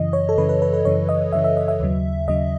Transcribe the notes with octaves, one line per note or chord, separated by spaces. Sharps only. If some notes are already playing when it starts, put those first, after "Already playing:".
Already playing: F#2 C#3 E3 D#5
C#5
A4
F#2 C#3 E3 B4
B4
B4
B4
F#2 C#3 E3 C#5
D#5
F#2 C#3 E3 E5
E5
D#5
E5
D#2 C#3 F#3
D#2 C#3 F#3 D#5